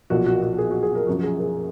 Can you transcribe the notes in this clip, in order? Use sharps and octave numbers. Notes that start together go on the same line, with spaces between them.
B1 A#2 F3 F#4
F#4
F#4
G#4
F#4
G#4
A#4
F#1 F#2 F3 F#4
G#4
G#4